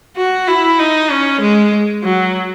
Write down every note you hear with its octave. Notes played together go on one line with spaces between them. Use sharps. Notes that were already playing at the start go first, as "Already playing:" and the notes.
F#4
E4
D#4
C#4
G#3
F#3